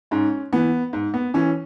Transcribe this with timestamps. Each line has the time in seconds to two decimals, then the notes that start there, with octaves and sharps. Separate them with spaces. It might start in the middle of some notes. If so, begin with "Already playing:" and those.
0.11 G#2 C#4
0.53 E3 B3
0.93 G#2
1.14 B3
1.34 E3 C#4